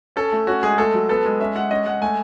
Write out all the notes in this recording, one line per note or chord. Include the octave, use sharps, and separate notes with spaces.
C#4 A4
A3
C#4 F#4
G#3 G#4
A3 A4
F#3
B3 A4
G#3
C#4 E5
G#3 F#5
C#4 D#5
G#3 F#5
A3 G#5